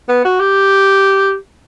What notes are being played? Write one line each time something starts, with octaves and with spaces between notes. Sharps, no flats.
B3
F#4
G4